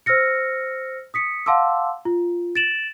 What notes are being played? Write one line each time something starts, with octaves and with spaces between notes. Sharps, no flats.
C5 E6 F6 A#6 C#7
D#6 B6 C#7
F5 F#5 A5 C6 D6 E6
F4
A6 D7 E7 F#7